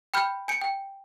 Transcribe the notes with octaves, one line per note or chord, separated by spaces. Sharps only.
G5 B5 F6 G6
G#5 G6 C#7 D7
G5